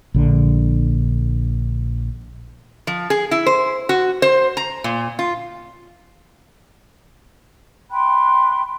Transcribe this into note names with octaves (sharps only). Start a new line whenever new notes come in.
A#1 D3
F3
G#4
E4
C5
F#4
C5
A#5
A#2
F4
G5 B5 C6 F#6